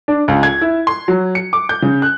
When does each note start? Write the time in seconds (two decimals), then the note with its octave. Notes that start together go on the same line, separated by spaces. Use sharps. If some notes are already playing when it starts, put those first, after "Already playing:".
0.08 D4
0.28 C#2
0.43 G#6
0.61 E4
0.87 C6
1.08 F#3
1.35 C#7
1.53 D6
1.69 G6
1.82 C#3
2.02 F#6